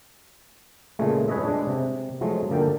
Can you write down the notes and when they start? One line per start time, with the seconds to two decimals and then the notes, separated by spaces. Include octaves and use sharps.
0.99 A#2 C#3 G#3 A3
1.28 G#4 B4 C#5 D#5 E5
1.44 G#3 D4
1.67 C3
2.21 F3 F#3 G#3 A3
2.50 D3 A#3 A4 G5